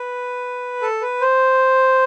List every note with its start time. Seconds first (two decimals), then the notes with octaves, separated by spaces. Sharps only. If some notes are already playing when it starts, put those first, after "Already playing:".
Already playing: B4
0.82 A4
1.02 B4
1.21 C5